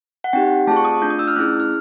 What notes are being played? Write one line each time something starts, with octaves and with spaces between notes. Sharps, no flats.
F#5
C4 D#4 G4 G5
A3 C4 F4 G#4 A5
C#6
D#6
A3 D4 F4 G6
D#6
E6
F6
A3 C#4 E4 G#4 F#6
F6